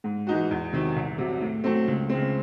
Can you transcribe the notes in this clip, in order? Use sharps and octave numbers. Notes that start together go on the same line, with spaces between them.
G#2
E3 G#3 D#4 F#4
E2
C3 D#3 F#3
C2
C3 F#3
A2
F#3 A3 C4
C#2
C#3 G#3 C4